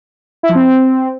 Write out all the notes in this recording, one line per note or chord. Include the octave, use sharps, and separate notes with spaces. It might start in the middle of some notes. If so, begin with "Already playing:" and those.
E4
F3
C4